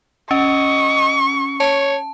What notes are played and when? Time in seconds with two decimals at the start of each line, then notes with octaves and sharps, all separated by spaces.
0.31 C#4 D#5 C#6
1.60 C#5 A5